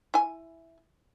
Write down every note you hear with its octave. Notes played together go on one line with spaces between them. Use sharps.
E4 G#5